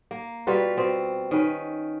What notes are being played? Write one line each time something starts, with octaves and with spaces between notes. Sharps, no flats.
A#3
B2 G3 F4 B4
B2 C4
D#3 C#4 B4